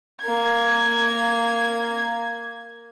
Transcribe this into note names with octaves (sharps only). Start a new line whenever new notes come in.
A#3 G#6